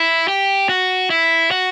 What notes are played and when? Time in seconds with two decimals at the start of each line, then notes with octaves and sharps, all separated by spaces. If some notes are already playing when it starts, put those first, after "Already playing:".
Already playing: E4
0.28 G4
0.69 F#4
1.10 E4
1.51 F#4